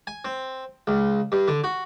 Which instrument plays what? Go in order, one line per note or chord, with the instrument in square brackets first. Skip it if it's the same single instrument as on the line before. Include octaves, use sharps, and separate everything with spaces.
[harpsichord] G#5
C4
C#2
G2
D3
F#4